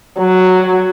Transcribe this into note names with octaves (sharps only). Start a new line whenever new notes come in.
F#3